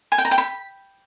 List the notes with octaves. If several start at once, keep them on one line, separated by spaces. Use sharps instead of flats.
G#5
G5
A#5
G5
B5